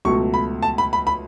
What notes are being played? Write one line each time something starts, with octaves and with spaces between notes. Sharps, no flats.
C#2 B2 F#3 A3 C#6
B5
A5
B5
B5
B5